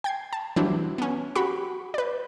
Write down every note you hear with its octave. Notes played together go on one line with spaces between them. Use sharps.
G5 G#6 C7
A5
E3 F#3 G3 C4 D4 E4
B3 C#4
F#4 G4 F#5 B5 C#6
B4 D5